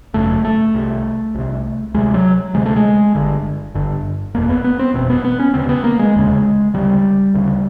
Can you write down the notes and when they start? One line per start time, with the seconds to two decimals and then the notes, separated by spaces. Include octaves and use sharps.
0.14 G#1 F#2 C#3 A3
0.45 A3
0.74 C2 C3
1.35 C2 C3
1.94 D2 C3 G#3
2.14 F#3
2.54 D2 C3 G#3
2.65 A3
2.76 G#3
3.15 G1 G2 D3
3.75 G1 G2 D3
4.34 F#1 E2 B2 A#3
4.49 B3
4.64 B3
4.79 C4
4.94 F#1 E2 B2 C4
5.10 B3
5.25 B3
5.40 C#4
5.54 E1 D2 C#3 C4
5.69 B3
5.84 A#3
5.99 G#3
6.15 E1 D2 C#3
6.74 D2 C#3 G3
7.35 D2 C#3